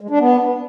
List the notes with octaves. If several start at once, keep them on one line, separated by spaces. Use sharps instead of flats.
G#3
D4
B3